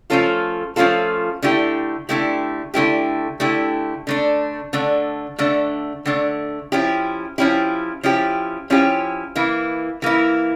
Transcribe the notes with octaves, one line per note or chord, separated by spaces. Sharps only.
F3 A3 C#4 F4 A4
F3 A3 C#4 F4 A4
D3 A3 E4 G4
D3 A3 E4 G4
D3 A3 E4 G4
D3 A3 E4 G4
D3 A3 D4
D3 A3 D4
D3 A3 D4
D3 A3 D4
F3 C#4 E4 G4
F3 C#4 E4 G4
F3 C#4 E4 G4
F3 C#4 E4 G4
E3 A#3 E4
E3 A#3 E4